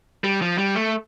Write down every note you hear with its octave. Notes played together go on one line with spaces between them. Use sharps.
G3
F3
G3
A3